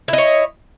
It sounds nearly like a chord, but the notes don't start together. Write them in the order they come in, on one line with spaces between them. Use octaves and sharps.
E4 D#5 C#5